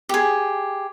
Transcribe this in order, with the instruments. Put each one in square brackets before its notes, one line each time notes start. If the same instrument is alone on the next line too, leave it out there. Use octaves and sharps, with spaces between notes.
[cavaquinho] G4 G#4